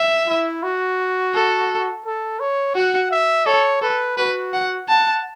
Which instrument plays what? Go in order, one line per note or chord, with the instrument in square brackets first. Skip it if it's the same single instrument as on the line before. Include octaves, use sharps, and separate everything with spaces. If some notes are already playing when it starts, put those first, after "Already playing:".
Already playing: [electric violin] E5
[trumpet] E4
F#4
[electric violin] A4
[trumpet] A4
C#5
[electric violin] F#4 [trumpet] F#5
[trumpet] E5
[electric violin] A4 [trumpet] C#5
[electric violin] A4 [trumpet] B4
[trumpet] F#4 [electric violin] B4
[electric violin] F#5
[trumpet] F#5 [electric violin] A5